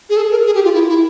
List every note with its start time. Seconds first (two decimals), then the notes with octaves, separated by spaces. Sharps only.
0.10 G#4
0.17 A4
0.31 A#4
0.46 G#4
0.55 G4
0.64 F4
0.74 E4
0.89 E4